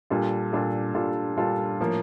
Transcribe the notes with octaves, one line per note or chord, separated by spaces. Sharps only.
A#2 G3 D4 F4 A4
A#2 G3 D4 F4 A4
A#2 G3 D4 F4 A4
A#2 G3 D4 F4 A4
A2 F3 A#3